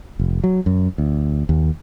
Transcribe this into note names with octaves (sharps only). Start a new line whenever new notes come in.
F1
F#3
F#2
D2
D#2